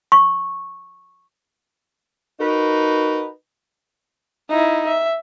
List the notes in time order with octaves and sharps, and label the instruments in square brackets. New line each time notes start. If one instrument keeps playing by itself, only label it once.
[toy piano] C#6
[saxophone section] D#4 F#4 A#4 B4
[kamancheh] D#4 E4
E5